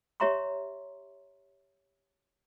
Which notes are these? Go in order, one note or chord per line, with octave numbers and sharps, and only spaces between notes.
G4 C#5 E5 A#5 C6 C#6